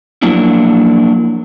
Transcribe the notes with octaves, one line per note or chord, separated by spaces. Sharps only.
F3 F#3 A#3 D4 E4